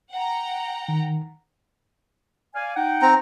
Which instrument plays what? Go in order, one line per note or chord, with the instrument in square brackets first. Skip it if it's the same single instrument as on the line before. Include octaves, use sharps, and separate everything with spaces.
[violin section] F#5 G5 A#5
[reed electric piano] D#3
[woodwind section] D5 F5 G#5
D#4 F#5 G5
[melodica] C4 A#5